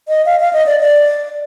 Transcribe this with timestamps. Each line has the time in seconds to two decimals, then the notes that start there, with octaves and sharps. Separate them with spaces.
0.08 D#5
0.26 F5
0.40 F5
0.53 D#5
0.66 D5
0.80 D5